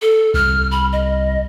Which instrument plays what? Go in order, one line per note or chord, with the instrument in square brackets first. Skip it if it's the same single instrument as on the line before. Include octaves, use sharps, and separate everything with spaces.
[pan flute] A4
[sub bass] C2 [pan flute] F6
[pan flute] B5
D#5